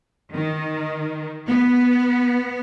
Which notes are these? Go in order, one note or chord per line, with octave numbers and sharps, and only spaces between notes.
D#3
B3